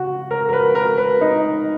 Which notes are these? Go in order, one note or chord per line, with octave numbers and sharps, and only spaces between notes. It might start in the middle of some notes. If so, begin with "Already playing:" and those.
Already playing: C#3 F#4
A#4
A#4
B4
A#4
B4
D#4